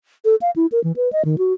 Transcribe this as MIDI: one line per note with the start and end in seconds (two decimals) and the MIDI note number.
0.25 0.36 69
0.41 0.51 77
0.56 0.66 64
0.72 0.82 70
0.84 0.92 52
0.96 1.11 71
1.13 1.23 75
1.25 1.36 51
1.38 1.53 66